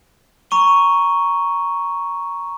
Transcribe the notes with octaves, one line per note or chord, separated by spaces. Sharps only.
A#5 C#6 D#7 G7